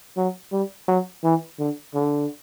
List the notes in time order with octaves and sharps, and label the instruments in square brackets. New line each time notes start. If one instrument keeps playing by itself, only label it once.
[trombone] F#3
G3
F#3
E3
D3
D3